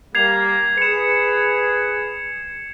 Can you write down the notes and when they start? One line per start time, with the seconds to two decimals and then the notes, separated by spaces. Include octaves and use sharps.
0.15 G3 A#3 G#6 C7 F7
0.78 G#4 B4 C#7 E7